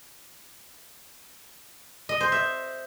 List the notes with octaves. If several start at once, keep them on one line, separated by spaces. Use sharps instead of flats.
D#5
C5
E5